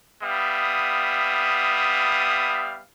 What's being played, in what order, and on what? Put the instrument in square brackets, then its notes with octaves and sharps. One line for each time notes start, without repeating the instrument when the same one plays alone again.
[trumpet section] G3 B3 E5 F5 D#6